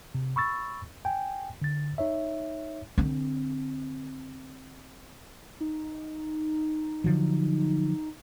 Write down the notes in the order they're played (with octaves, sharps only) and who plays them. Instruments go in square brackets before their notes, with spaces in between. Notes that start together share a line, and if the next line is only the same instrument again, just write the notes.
[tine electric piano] C3
B5 C#6 E6 A6
G5 G#5
D3 A6
D#4 C#5 E5
[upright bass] D3 C4
[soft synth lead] D#4
[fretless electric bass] D3 F3 F#3